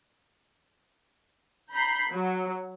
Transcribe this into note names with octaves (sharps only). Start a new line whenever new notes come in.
A#5 B5 G6 B6 C7
F#3